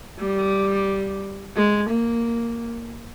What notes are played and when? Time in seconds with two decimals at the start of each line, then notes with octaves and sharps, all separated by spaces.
0.19 G3
1.56 G#3
1.90 A#3